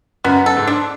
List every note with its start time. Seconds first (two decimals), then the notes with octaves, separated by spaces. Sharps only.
0.24 F#2 B3
0.46 A4
0.57 G#2
0.67 D4